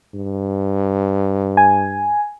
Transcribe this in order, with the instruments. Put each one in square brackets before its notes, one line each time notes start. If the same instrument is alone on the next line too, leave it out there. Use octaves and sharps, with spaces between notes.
[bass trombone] G2
[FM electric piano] G#5